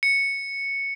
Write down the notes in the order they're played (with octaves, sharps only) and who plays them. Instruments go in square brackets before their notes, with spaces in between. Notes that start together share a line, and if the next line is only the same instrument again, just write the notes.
[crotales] C#7